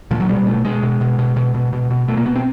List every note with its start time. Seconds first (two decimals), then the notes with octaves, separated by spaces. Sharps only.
0.11 A#2 F3
0.20 F#3
0.29 B2 G3
0.47 B2 A3
0.65 B2 G#3
0.83 B2
1.01 B2
1.19 B2
1.36 B2
1.54 B2
1.73 B2
1.90 B2
2.08 B2 A3
2.17 A#3
2.26 B2 B3
2.36 C4